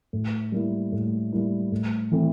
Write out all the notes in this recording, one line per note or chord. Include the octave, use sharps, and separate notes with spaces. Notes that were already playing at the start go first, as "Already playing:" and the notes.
A2
G3 A#3 E4
A2
G3 A#3 E4
A2
E3 A3 C4 E4